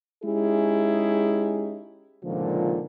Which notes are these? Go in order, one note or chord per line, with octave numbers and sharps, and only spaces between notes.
G#3 C#4 D#4 E4 G4 G#4
C#2 A#2 D3 D#3 F3